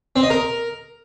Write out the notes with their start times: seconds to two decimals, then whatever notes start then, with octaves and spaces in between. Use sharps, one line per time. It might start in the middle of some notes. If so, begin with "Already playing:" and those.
0.16 C4
0.23 D#5
0.30 A#4